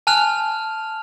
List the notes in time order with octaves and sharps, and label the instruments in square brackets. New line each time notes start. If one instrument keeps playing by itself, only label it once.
[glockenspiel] G#5 A5 F6 F#6 F7